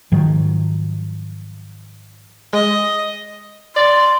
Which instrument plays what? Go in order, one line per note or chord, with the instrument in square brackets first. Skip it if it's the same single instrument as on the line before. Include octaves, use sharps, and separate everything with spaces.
[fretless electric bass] G#2 D#3 F3 F#3
[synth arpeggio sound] G#3 [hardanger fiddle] D#5
[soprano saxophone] D5 [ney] C6